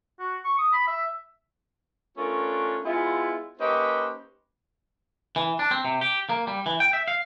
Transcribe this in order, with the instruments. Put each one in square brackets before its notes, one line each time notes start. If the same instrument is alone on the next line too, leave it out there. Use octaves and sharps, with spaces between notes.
[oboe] F#4
C#6
D#6
B5
E5
[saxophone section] A3 C#4 D4 F4 A#4
G#3 B3 E4 F4
A#3 C#4 D#4 G4 B4 C5
[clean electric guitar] E3
D4
C4
C3
G4
A#3
G3
E3
G5
E5
F5